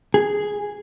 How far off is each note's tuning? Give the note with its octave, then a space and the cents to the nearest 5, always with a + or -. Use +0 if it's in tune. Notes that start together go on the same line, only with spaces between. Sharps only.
G#4 +0